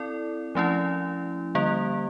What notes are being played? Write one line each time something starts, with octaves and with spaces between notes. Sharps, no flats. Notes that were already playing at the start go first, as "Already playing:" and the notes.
Already playing: C4 E4 A4 D5
F3 A3 C#4 E4
D3 G3 A#3